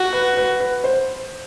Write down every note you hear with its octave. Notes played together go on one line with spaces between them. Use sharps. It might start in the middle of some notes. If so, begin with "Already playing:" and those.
Already playing: F#4
B4
B4
B4
C5